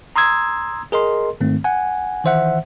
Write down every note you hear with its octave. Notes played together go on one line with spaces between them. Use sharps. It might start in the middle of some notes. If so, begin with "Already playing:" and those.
A#5 C6 D#6 E6 G#6
G#4 A#4 D#5 C6
G#2 D#3 A3 C4
F#5 G#5
D#3 E3 C5 E5 F#5